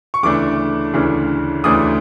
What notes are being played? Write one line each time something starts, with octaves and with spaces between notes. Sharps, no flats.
C#6
D2 C#3 E3 A3 D4 D6
D2 C#3 E3 A3 D4
D2 C#3 E3 A3 D4 D#6